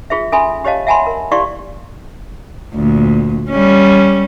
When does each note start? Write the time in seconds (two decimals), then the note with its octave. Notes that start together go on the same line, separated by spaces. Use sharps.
0.10 F4 G#4 C5 E5
0.32 C#4 A4 E5 G#5 B5 C6
0.64 G4 C5 C#5 D#5 F5 A5
0.87 E5 F#5 G#5 A5 B5 C6
1.06 A#4
1.31 E4 G4 D5 F5 C6 C#6
2.75 D2 A#2
3.51 G3 C#4